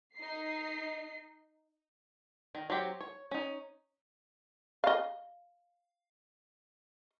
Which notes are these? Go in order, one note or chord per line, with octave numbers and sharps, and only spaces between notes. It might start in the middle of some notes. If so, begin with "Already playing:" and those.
D#4 C7
D#3
F#3 C4 G4
C#5
C#4 D#4
D#5 F5